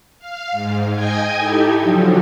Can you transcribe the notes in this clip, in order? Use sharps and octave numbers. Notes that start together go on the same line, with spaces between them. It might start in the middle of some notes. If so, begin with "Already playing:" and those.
F5
G#2
D#5 G5 G#5 G#6
D#4 E4 G4 A4
D3 F3 F#3